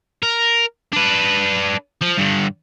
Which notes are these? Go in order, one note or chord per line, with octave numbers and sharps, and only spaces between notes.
A#4
D4 B4
F3
G2 D3